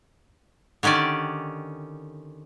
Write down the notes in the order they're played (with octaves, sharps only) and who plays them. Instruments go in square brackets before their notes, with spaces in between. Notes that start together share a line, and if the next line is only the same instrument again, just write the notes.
[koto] D3 D#3 C#4 G4 D5